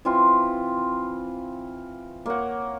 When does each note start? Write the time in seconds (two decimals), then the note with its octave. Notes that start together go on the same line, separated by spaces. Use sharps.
0.05 E3 C4 F4
2.26 A#3 C#5 F#5